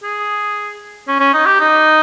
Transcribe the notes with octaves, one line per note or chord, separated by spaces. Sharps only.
G#4
C#4
C#4
D#4
G4
D#4